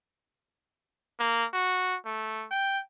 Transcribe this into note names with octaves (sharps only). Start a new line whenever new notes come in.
A#3
F#4
A3
G5